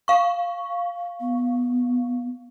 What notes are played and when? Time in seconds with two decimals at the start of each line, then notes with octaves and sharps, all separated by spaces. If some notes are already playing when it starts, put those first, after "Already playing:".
0.08 F5 C#6
1.20 B3